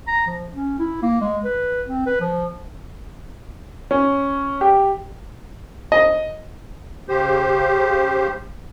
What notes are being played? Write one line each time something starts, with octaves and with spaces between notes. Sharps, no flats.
A#5
F3
C#4
E4
A#3
G#3
B4
C4
B4
F3
C#4
G4
D#5
C#3 G4 C5